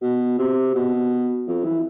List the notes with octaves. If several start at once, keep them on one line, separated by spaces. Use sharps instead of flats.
B2
C3
B2
F2
E3